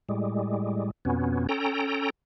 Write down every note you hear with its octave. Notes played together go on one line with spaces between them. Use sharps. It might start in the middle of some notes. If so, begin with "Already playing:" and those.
A2 G3 G#3
F2 B2 B3 C#4
C#4 A4 G5 A#5